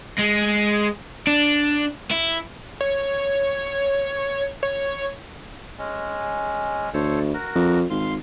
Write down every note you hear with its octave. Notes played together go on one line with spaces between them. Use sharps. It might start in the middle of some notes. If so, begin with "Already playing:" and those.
G#3
D4
E4
C#5
C#5
G#3 C#4
D2 A4 C5 C#5
F#4 A#4
F2
G#1 F5 C6